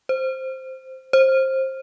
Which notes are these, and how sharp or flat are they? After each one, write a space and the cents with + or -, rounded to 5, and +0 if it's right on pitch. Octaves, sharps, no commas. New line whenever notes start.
C5 +0
C5 +20